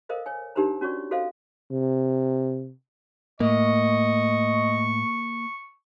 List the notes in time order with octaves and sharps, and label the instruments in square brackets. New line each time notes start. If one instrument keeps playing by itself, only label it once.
[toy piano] A4 A#4 C5 D#5 F5
C#5 G#5
D4 D#4 G4 A#4 C5 A#5
C#4 F#4 C#5 D5 C#6
F#4 A4 C5 D#5 F5
[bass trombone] C3
[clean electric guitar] A2 [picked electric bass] A#3 [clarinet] D#5 [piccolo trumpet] C#6